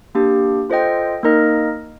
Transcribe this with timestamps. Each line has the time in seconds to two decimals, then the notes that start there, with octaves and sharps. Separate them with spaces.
0.15 A#3 D4 G4
0.70 F4 A4 C5 D#5 G5
1.23 A#3 D#4 A#4 D#5